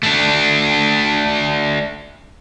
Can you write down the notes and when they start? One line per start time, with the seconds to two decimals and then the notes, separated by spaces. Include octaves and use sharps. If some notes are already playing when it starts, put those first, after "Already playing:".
0.03 A3 D4